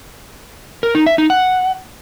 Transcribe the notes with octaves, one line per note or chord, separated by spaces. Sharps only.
A#4
D#4
E5
D#4
F#5